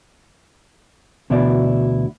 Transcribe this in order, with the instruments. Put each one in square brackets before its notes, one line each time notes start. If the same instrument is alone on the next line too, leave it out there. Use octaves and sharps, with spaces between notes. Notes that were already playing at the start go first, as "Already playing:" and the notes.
[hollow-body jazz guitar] D2 B2 E3 D4 E4 D5